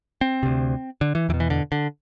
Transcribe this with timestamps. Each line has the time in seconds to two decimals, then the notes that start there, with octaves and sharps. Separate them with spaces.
0.21 C4
0.43 D2 C3
1.01 D3
1.15 E3
1.29 E2 E3
1.34 B2
1.40 E3
1.50 D3
1.72 D3